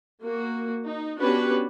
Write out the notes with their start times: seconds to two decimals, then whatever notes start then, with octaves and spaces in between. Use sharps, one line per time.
0.22 A#3 F#4
0.85 D#4
1.19 B3 C#4 D4 F#4 G4 B4